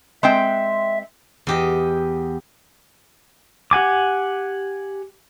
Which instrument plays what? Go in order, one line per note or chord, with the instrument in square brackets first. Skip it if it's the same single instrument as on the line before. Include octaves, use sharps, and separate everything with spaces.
[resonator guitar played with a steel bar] G#3 C4 G5 [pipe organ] E5
[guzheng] E2 G4 D#5
[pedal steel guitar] G4 F#5 G#5 D6